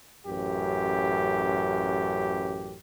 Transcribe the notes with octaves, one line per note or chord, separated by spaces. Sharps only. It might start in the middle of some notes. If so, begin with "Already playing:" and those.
A1 F#2 G4